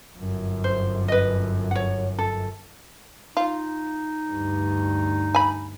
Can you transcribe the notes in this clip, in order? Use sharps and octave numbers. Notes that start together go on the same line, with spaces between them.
G1 F#2
C5
B4 D#5
C#5 F#5
A4
D#4 F4
D2 G2
G#5 B5